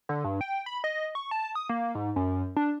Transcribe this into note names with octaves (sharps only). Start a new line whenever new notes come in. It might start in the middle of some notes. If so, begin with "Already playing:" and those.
D3
G2
G5
B5
D#5
C#6
A5
D#6
A#3
G#2
F#2
D4